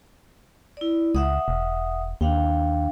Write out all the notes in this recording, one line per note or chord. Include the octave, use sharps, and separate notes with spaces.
E4 D5
C#2 E5 F#5 D#6
E1
D#2 D4 F5 G5